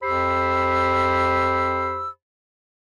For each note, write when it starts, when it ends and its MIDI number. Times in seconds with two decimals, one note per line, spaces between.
0.03 2.09 41
0.03 2.09 67
0.03 2.09 72
0.03 2.09 83
0.03 2.09 88